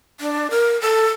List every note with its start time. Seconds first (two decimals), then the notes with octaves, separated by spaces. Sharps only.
0.20 D4
0.51 A#4
0.81 A4